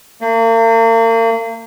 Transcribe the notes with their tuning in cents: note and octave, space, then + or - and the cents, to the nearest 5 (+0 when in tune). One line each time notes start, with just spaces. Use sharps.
A#3 -40